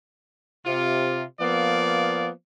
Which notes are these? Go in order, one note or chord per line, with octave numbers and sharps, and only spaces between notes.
C3 F4
F3 A#3 B3 D5